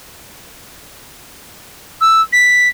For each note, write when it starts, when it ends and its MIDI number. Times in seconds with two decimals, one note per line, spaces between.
2.01 2.21 88
2.32 2.68 95